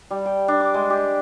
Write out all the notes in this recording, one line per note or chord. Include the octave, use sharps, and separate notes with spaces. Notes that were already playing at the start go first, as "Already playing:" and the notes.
G3
G5
D4
D6
G#3
G4